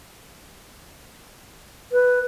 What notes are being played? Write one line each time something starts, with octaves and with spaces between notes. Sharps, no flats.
B4